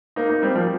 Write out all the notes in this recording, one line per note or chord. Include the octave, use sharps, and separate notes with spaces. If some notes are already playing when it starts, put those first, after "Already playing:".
A#3 D#4
A#3 D#4
G3 C4
F3 A#3